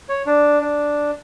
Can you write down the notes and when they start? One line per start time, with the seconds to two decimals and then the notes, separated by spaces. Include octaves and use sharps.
0.09 C#5
0.26 D4
0.61 D4